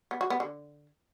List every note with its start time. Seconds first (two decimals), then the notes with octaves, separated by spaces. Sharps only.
0.11 B3
0.21 F#4
0.30 B3
0.40 D3